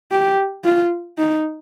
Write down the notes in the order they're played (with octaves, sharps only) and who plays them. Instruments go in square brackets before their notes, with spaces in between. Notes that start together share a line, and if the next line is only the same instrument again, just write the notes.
[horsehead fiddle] G4
F4
D#4